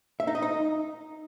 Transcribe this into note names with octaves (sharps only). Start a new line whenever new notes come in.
E5
D#4
D#5
D#4